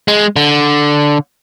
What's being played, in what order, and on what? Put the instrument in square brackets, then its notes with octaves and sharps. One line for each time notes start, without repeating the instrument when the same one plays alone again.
[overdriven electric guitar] G#3
D3